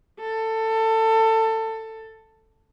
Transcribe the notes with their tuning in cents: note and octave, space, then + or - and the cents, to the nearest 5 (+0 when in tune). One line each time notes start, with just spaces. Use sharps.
A4 +20